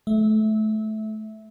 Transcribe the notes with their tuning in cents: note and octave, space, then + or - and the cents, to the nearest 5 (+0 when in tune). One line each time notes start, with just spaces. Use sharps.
A3 -25 E5 -5